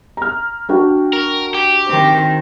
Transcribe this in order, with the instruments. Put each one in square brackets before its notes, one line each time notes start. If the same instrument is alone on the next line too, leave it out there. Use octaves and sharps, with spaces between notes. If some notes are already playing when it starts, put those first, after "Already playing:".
[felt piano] A#5 F6
D4 F#4 G5
[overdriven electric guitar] A#4
G4
[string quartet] D#3 C4